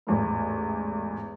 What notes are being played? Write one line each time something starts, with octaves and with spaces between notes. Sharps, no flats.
A1 E2 G#2